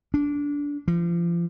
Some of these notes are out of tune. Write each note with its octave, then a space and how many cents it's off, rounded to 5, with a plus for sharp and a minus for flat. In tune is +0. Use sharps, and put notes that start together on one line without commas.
D4 -20
F3 -35